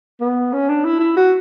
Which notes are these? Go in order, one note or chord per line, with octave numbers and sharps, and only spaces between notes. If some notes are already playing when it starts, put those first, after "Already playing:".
B3
C#4
D4
E4
E4
F#4